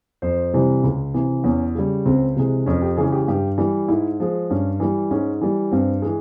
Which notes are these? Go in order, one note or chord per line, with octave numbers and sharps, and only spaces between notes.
F2 C5
C3 E3 G3
C#2
C3 E3
E2 C#4
C#3 G3
C#2 C4
C3 E3 G#3
F2 C#4
G4
C#3 E3 G#3 G#4
G4
G2 G4
E3 G3
G#2 E4
F3 G#3
G2 C#4
E3 G3
G#2 C#4
E3 G3
G2 C4
E3 G#3